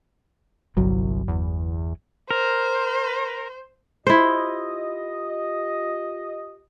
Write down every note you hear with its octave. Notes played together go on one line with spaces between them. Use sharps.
G1 C2 F#3
E2
A#4 C5
E4 F4 G4 C5 D#5